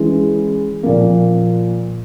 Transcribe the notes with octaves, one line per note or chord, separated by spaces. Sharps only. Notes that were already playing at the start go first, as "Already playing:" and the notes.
Already playing: E3 G#3 C#4
A#2 F3 A#3